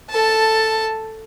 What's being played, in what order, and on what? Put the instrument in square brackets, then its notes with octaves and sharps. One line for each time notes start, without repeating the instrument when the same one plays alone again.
[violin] A4 A5